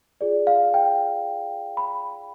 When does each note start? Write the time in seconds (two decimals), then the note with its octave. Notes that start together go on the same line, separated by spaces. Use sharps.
0.21 F4 G#4 D5
0.47 F5
0.74 G5
1.77 B5